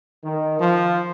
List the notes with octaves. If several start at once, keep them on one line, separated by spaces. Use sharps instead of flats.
D#3
F3